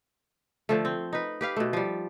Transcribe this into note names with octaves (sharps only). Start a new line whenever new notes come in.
D3 F3 A3
C4
D#4 B4
G4 B4 F5
B2 A3
F3 G3